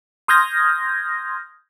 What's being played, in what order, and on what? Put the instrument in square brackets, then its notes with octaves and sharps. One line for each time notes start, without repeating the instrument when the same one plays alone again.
[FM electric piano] C6 D#6 F6 G6 G#6 A#6